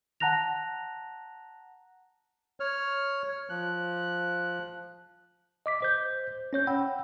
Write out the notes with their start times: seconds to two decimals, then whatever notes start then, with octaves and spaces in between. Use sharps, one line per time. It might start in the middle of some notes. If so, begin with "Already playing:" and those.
0.20 F#5 A5 A#5 F#6 A#6 F7
2.60 C#5 F6
3.50 F3 F#6
5.66 D#5 D6 B6
5.82 C5 G6
6.53 C#4 C#5 G6
6.67 F#5 G5 B5 E6